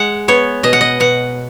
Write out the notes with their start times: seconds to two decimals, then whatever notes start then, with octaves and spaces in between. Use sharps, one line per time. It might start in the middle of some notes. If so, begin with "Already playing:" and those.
Already playing: G#3 F#5
0.28 B3 C#5
0.63 B2 D#5
0.73 F#5
0.81 D#5
1.00 B2 F#5